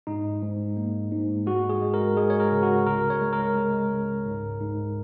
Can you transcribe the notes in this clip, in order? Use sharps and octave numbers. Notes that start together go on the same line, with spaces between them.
G#2 D#4
G#2
A#3
G#2
G#3 F#4
G#4
G#3
A#4
G#3 G#4
C#5
A#4
C#3
F#4
C#2 A#4
C#5
G#3
A#4
G#3
C#2
G#2
G#2